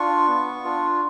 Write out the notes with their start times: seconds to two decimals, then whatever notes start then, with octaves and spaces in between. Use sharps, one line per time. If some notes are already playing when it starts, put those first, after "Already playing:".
Already playing: D4 F4 C#6
0.27 B3
0.64 D4 F4